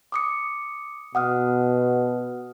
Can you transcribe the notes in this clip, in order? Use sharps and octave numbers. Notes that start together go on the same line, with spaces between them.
D6 D#6 C#7
B2 F#5 D#6 F6